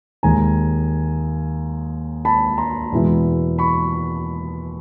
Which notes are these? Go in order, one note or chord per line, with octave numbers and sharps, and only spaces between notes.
D#2 D#3 G#3 G#5 A#5
A5 B5
A#5 C6
E2 B2 G#3 B3 E4
B5 C#6